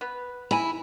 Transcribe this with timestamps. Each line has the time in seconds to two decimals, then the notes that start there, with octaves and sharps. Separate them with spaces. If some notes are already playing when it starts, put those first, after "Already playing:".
0.01 B3 B4
0.51 E4 G#5 A#5 B5